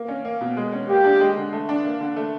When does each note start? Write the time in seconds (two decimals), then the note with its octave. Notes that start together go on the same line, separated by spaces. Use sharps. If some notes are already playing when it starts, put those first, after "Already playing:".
Already playing: A#3
0.08 C#4
0.25 A#3
0.41 B2
0.57 G#3
0.73 C#4
0.89 A#3 G4
1.04 D4
1.21 G#3
1.37 D3
1.53 A3
1.69 D4
1.85 A#3
2.01 D3
2.16 A3